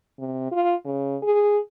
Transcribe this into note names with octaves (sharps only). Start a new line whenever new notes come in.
C3
F4
C#3
G#4